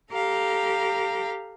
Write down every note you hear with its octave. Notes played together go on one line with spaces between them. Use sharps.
G4 A4 F5 A#5